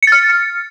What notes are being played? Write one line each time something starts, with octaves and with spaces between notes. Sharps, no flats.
F6 A6 C#7